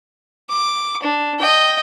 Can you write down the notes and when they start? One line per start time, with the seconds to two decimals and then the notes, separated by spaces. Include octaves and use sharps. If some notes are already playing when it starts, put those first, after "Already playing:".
0.49 D6
1.02 D4
1.39 D#5 G5